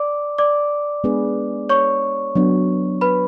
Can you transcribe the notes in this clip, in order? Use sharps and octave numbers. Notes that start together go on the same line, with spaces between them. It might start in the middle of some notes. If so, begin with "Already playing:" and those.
Already playing: D5 D6
D5 D6
G#3 B3 D4 G#4 B4
C#5 C#6
F#3 B3 D4
B4 B5